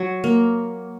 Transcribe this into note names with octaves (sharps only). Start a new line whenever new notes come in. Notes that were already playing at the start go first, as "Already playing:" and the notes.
Already playing: F#3
A#3